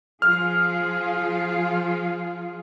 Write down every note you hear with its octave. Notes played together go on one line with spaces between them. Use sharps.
F3 F4 G#4 F6